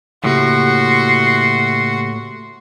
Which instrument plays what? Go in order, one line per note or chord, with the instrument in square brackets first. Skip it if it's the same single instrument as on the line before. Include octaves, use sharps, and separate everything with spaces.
[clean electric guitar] A2 [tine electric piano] C#3 A#3 G4 [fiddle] F#4 [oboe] C6